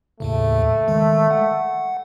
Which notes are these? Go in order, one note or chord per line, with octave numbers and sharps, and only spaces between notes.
D#2 A2 C#3 A3
D#3 G#3
F#5